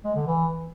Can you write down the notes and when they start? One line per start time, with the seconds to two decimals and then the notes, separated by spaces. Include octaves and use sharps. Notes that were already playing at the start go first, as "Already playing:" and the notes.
0.04 G#3
0.16 D3
0.27 E3